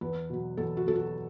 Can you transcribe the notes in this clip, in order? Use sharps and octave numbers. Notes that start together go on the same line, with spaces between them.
E2 B4
B2 F#3
E2 A4
F#4
B2 F#3 A4
F#4